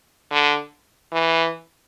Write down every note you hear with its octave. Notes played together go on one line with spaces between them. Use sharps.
D3
E3